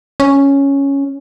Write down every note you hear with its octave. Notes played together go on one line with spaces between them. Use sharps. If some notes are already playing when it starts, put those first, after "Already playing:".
C#4